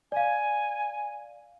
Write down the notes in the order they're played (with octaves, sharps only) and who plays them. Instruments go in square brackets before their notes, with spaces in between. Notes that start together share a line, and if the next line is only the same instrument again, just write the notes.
[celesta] D5 F5 [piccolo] G#5